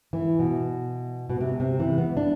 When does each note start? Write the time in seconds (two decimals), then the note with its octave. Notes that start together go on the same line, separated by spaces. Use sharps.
0.13 E3
0.39 B2
1.30 B2
1.41 C3
1.60 C3
1.80 E3
1.98 B3
2.17 D4